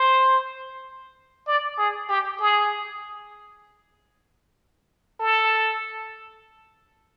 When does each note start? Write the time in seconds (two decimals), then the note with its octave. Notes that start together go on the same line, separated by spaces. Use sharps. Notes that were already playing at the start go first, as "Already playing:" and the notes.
Already playing: C5
1.47 D5
1.78 G#4
2.09 G4
2.40 G#4
5.20 A4